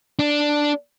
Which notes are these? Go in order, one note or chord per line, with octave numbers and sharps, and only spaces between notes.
D4